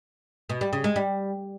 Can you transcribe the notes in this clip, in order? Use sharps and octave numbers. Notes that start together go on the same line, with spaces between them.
B2
G3
C#3
G#3
G3